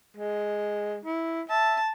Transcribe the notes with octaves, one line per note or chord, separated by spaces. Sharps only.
G#3
E4
E5 A5